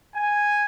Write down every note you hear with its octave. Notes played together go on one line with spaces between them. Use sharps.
G#5